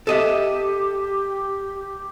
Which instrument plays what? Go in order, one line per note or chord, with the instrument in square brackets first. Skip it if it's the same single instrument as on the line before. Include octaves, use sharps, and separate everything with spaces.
[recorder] G4 [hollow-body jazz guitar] A4 D#5 E5